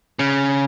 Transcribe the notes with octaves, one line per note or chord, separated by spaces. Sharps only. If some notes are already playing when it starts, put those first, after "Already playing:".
C#3